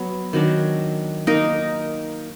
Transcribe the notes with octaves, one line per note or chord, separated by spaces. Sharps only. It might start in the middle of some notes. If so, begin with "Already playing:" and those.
Already playing: F#3 B3
D#3 F#3 D4
A#3 D#4 A#4